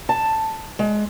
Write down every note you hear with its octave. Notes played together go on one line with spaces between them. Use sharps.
A5
G#3